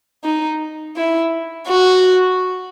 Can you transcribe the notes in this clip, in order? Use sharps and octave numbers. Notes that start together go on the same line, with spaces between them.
D#4
E4
F#4